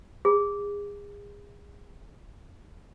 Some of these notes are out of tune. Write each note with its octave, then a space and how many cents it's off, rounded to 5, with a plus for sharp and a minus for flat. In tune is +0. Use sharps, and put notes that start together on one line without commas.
G#4 -30